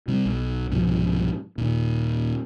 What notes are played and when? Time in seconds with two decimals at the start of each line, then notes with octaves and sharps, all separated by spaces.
0.08 C3 G3
0.26 B1
0.71 C2 G#2 B2 F3
1.58 D#2 A#2